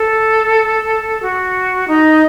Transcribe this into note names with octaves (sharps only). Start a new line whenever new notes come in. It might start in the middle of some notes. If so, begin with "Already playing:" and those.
Already playing: A4
F#4
D#4